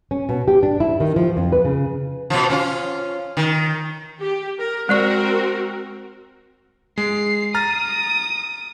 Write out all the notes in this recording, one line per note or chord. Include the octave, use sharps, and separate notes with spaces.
C#4
B2
G4
D4
E4
D#3
F3
F2
B4
C#3
B2 F3
C#4 F4
D#3
G4
A#4
G#3 C4 F#4 A#4 D5 C#6
G#3 C7
A#5 D#6 F6 A6